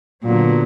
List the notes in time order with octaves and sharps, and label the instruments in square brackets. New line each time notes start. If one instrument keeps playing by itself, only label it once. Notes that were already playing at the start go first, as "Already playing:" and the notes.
[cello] A#2 [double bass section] D3 F#3 B3